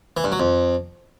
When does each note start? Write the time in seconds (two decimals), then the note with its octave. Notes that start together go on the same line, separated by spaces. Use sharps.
0.17 E3
0.24 G2
0.32 F#3
0.40 F2